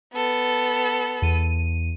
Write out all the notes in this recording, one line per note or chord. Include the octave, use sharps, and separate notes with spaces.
B3 A4
E2 D#7